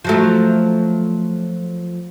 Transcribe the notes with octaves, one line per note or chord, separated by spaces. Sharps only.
F3 F#3 A3